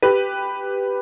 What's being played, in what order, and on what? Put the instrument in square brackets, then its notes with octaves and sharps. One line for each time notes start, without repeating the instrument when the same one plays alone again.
[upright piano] G4 B4